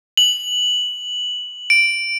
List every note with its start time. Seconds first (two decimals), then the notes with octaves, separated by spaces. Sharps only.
0.17 F#7
1.70 D7